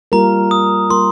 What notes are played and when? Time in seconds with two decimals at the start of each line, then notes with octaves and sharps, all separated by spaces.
0.12 G3 A#3 F4 A#4 A#5
0.51 D#6
0.89 G3 A#3 F4 A#4 C6